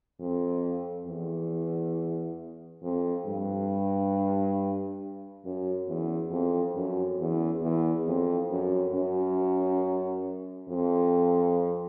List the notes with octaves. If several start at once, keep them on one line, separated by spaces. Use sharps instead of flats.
F2
E2
F2
G2
F#2
E2
F2
F#2
E2
E2
F2
F#2
F#2
F2